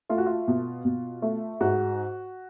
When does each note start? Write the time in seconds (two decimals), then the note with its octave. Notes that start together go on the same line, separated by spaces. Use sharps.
0.09 A3 F4
0.18 F#4
0.26 F4
0.48 B2
0.85 B2
1.22 A3
1.61 G#2 F#4